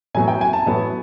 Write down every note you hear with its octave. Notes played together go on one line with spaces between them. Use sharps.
A2 F#3 B3 G#5
G5
G#5
A5
A2 F#3 B3